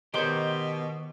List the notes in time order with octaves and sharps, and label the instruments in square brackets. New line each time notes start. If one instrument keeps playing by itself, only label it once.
[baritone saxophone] B2 [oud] D#3 C#5 [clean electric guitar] G4 C5